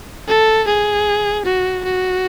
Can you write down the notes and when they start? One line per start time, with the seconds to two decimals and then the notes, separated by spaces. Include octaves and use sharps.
0.28 A4
0.67 G#4
1.45 F#4
1.84 F#4